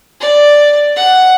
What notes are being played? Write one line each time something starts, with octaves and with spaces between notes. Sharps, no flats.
D5
F#5